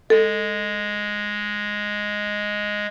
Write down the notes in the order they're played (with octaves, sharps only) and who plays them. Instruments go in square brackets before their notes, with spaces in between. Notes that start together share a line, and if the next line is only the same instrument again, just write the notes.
[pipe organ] G#3 [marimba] A4